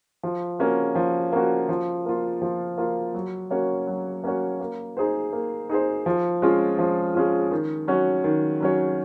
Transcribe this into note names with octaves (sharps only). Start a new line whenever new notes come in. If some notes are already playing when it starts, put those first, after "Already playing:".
F3
A#3 C#4 F#4
F3
A#3 C#4 F#4
F3
A#3 F4
F3
A#3 F4
F#3
A#3 C#4 F#4 C#5
F#3
A#3 C#4 F#4 C#5
A#3
D#4 G#4 C5
A#3
D#4 G#4 C5
F3
G#3 C#4 F4
F3
G#3 C#4 F4
D#3
F#3 C#4 F#4 C#5
D#3
F#3 C#4 F#4 C#5